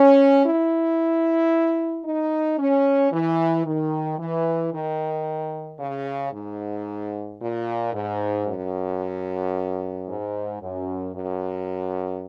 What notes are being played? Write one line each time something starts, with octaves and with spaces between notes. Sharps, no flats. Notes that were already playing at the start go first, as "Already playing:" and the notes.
Already playing: C#4
E4
D#4
C#4
E3
D#3
E3
D#3
C#3
G#2
A#2
G#2
F#2
G#2
F#2
F#2